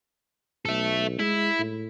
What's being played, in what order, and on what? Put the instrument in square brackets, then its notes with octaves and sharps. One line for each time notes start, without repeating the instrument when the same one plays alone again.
[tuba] B1 [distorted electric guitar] A4 E5
[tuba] G#3 [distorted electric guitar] E4
[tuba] A2